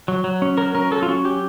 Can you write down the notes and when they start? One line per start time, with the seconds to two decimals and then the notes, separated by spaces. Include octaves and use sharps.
0.08 F#3
0.24 F#3
0.42 C#4
0.58 F#3 A#4
0.75 C#4 A#4
0.91 F#3 A4
1.02 F4
1.08 C#4 F#4
1.25 F#3 G4